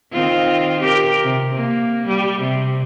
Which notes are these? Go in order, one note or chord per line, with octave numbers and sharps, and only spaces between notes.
D#3 C4 F4
G4 A#4
C3
A#3
G3
C3